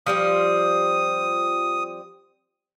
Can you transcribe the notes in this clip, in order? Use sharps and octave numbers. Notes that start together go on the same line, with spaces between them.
F3 G3 C4 D#6